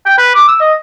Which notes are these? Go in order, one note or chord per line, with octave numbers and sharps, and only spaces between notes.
G5
B4
D6
E6
D#5